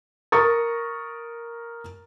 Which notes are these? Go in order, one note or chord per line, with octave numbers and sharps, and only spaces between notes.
A#4 A#5 C#6 D#6 A6